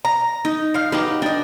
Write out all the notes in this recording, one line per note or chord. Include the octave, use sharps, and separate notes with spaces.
A#5
D#4
F3 F5
F#3 D#4 G4 B4
D4 D#5 G5